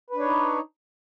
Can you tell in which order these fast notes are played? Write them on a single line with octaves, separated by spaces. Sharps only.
B4 D4 C#5 D#4